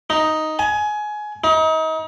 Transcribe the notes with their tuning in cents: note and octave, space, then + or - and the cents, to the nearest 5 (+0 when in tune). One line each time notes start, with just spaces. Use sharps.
D#4 +5
G#5 +20
D#4 +35